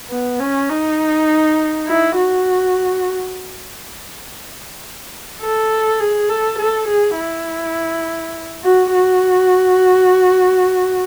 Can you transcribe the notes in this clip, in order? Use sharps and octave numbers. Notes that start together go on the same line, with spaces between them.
B3
C#4
D#4
E4
F#4
A4
G#4
A4
A4
G#4
E4
F#4
F#4